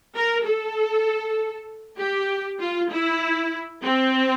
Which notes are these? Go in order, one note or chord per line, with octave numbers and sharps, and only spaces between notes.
A#4
A4
G4
F4
E4
C4